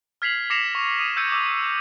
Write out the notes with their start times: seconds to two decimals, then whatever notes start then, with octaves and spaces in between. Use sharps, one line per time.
0.22 F6 G#6 B6 C7 F7 F#7
0.50 D6 A#6 C7 C#7 E7 F7
0.75 C#6
0.99 D#6 D#7 F7
1.16 E6 G6 G#6 C#7 D#7 E7
1.32 D6 E6 F7